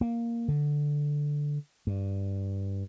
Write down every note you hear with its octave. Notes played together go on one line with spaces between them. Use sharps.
A#3
D3
G2